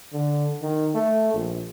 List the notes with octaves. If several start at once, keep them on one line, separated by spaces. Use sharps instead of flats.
D3
D#3
A3
A#1